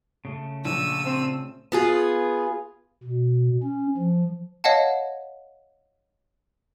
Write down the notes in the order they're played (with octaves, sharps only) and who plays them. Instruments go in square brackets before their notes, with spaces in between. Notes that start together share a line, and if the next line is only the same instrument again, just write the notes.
[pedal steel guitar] C#3 A3
[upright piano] A#1 [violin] E6 D#7
[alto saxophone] C4
[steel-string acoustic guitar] B3 F4 G#4
[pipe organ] B2
C#4
F3
[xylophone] C#5 D#5 F5 F#5 A5